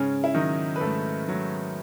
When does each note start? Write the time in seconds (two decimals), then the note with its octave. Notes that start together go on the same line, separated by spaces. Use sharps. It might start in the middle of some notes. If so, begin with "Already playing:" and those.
Already playing: G#2 C#3 C#4
0.24 E4
0.34 D#3 F#3 D#4
0.76 B4
0.81 G#2 A3 A4
1.28 F#3